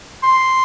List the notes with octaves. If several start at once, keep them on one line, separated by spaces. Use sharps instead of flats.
C6